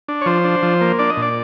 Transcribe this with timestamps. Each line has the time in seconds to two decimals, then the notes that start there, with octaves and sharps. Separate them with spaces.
0.08 D4
0.21 C#5
0.26 F3 C5
0.44 D4
0.63 F3
0.81 A#3
0.99 D4 D5
1.10 D#5
1.17 A#2
1.22 D5